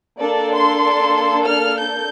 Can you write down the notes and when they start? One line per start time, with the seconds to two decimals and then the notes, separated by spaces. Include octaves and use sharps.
0.20 A#3 D4 A4 D5
0.52 C6
1.46 F6
1.78 G6